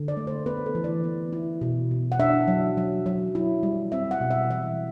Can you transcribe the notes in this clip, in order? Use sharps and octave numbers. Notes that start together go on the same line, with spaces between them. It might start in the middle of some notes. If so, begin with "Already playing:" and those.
Already playing: D3
D5
A3
C5
B3 B4
A4
E3
D5
B3
E4
B2
B2
F#5
D4 E5
F#3
F#3
F#3
E4
G3
C4 E5
F#5
B2
E5
E3 E5